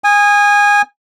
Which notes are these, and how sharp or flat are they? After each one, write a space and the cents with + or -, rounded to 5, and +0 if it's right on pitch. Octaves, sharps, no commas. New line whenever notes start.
G#5 -20 D#6 +0